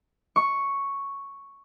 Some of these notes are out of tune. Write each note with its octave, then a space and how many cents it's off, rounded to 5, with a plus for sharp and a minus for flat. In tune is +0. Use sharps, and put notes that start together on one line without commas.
C#6 +0